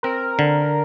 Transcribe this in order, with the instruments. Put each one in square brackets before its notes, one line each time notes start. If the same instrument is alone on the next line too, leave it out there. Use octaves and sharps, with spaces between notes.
[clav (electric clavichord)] C4 [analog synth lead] A#4
[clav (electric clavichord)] D3